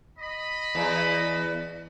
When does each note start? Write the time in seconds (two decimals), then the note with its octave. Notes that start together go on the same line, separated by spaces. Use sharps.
0.19 D#5 B5
0.75 E2